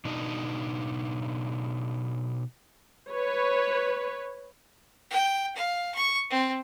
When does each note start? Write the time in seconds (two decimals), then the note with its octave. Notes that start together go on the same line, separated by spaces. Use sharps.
0.05 B2 D4 D#4
3.10 B4 C#5
5.10 G5
5.56 F5
5.95 C#6
6.30 C4